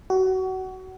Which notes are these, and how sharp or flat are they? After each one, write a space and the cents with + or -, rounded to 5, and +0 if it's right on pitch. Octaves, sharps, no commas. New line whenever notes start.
F#4 +25